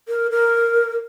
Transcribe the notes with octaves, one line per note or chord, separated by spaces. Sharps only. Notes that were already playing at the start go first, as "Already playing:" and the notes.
A#4
A#4